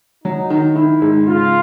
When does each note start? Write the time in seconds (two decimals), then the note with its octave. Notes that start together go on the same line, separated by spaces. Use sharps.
0.24 F#3 D#4
0.50 D#3
0.76 D#3 E4
1.02 G#2
1.27 C#3 F4